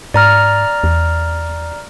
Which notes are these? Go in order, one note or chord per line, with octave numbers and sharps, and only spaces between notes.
G#2 D5 A#5 F6
E2